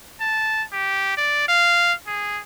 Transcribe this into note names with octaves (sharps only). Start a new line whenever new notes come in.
A5
G4
D5
F5
G#4